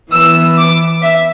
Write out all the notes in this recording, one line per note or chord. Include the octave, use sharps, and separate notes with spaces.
E3 B3 E6
D6
E5